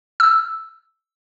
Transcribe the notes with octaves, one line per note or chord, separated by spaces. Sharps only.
E6